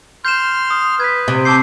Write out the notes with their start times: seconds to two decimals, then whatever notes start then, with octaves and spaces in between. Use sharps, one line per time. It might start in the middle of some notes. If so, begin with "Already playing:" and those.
0.25 C6 F6 G6 E7
0.70 D#6
1.00 B4 G#6 B6
1.28 C3
1.45 A5 D6 E6 G6 C7